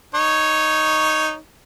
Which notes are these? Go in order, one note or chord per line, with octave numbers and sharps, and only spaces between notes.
D#4 C#5